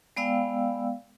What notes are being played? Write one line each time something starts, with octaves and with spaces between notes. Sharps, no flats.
G#3 B3 D5 F5 G5 E6